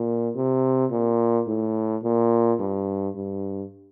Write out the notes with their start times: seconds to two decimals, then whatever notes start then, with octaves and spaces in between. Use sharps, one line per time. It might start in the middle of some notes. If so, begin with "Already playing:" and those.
Already playing: A#2
0.35 C3
0.91 A#2
1.47 A2
2.03 A#2
2.59 G2
3.15 G2